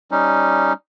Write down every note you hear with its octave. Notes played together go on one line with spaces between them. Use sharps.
G3 C#4 D#4